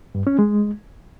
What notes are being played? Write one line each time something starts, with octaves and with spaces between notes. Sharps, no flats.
G2
C#4
G#3